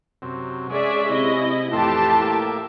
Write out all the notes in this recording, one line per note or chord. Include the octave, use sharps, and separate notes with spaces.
F#2 C3
G#3 C#4 G#4 D5 E5
C3 E4 D#5
F2 A2 E3 G4 E5 A5 C6
A#3 E5 D6